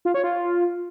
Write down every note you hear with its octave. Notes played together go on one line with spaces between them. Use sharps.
F4
C#5
F4